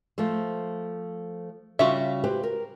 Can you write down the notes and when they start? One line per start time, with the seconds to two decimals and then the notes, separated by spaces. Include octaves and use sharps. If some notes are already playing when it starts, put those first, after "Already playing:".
0.18 F3 A3 C5
1.79 C#3 G3 F4 F#4 E5
2.24 G4 B4 C5
2.43 A#4